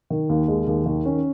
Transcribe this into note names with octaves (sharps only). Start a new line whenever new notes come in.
D#3
D#2
G#3
D#2
D#3
C#4